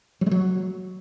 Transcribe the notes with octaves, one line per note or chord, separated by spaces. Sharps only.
F#3
G#3
F#3